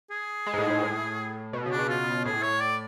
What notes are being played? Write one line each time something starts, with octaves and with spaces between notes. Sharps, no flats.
G#4
G#3
G#2
A2
A2
A2
B2
C#3
D4
B2
F4
A2 G#4
C#5
D5